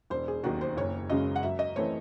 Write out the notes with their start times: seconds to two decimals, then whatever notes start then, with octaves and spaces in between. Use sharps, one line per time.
0.10 E1 C5
0.28 G#4
0.43 D#2 D#3 F#3 F#4
0.61 C5
0.77 F#1 C#5
1.10 F#2 C#3 G#3 C#4 D#5
1.36 F#5
1.43 F#2 E5
1.59 D#5
1.76 E3 A3 C4 C#5